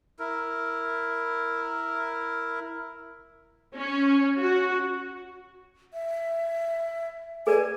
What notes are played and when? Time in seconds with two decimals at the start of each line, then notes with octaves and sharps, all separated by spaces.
0.19 E4 A#4
3.75 C#4
4.38 F#4
5.93 E5
7.47 G#4 B4 D5 G#5